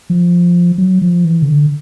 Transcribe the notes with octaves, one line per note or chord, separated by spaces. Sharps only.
F3
F#3
F3
E3
C#3
D3